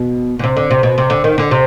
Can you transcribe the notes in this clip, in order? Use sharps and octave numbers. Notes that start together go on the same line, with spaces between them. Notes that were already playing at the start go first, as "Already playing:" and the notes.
Already playing: B2
D3
C3
D3
C3
B2
C3
D3
D#3
D3
C3